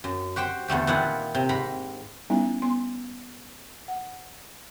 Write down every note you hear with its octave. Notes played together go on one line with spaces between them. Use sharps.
F#2
F#4 G4 C5 G5
E2 D3 A3 G4
A#2 D#3 D4 E4 F4 F#5
C3
G#2 A#5 B5
G3 B3 C#4 D#4 E4
B3 C6
F#5